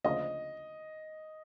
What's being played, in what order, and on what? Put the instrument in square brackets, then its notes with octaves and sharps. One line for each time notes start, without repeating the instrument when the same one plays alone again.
[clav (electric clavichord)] D2 C#3 F3 A#3 [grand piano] D#5